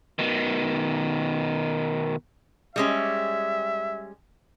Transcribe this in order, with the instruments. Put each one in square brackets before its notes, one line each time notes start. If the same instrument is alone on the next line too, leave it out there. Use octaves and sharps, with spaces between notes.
[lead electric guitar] B2 D#3
[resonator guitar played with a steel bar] G3 G#3 C#4 [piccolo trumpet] E5